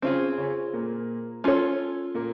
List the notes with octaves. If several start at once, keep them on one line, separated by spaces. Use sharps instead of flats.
C#3 C4 C#4 F4 G#4
C#3 C#4
A#2 A#3
C#4 F4 A4 C#5
A#2 A#3